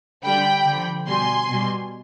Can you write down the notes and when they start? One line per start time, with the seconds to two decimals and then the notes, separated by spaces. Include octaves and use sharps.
0.23 D3 G3 G5 B5
0.66 D3 F3
1.07 B2 G3 G#5 C6
1.49 B2 G3